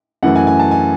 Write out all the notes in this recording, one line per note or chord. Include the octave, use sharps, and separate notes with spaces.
F#2 E3 A3 F#5
G#5
G#5
A5
G#5